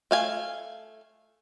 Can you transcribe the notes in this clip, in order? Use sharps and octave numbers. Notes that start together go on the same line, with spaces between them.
A3 F5 G#5